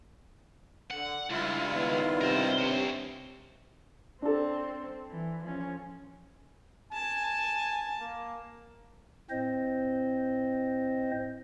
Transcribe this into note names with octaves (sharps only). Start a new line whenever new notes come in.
D3 F#5
C#2 G2 E4 F4
D#3 B3 D#4
C3 A#4 C5
G2 F#4 C5 C#5
C4 D4 A4
E3
F3 C#4
G#5 A5
A#3
A2 C4 C5 D#5